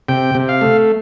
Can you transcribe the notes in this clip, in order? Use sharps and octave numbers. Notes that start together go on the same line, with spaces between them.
C3 G5
C3
F5
A3